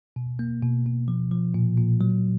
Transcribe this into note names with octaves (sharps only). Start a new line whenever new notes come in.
B2
A#3
B2
B2
F3
F3
A#2
A#2
F#3